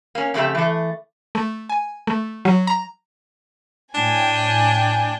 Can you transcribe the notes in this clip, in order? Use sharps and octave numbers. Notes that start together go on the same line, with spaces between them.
A#3 C#4
F2 C#3 A3 G4 E5
E3 A3
A3
G#5
A3
F#3
A#5
A2 D4 G5 G#5